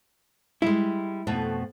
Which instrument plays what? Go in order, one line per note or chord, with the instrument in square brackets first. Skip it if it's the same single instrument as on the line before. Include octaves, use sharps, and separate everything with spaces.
[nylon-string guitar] G3 G#3 [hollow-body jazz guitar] E4
[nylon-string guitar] F2 B2 A3